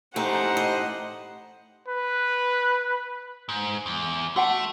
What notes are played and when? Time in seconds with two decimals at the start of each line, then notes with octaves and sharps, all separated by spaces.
0.16 A2 A3 D#4 G4 C5 F#5 G#5 A#5
0.57 D#5
1.88 B4
3.49 G#2
3.86 E2
4.36 A3 F#4 F#5 A5